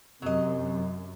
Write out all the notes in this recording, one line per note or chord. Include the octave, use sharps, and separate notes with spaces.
F#2 C3 F#3 D#5